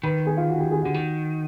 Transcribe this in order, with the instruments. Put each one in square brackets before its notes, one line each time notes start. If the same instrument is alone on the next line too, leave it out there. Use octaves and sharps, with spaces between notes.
[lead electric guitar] D#3 [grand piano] B4 B5
[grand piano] G#4 G#5
F4 F5
F#4 F#5
G4 G5
G#4 G#5
[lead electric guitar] D3 [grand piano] F#4 F#5
[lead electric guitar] D#3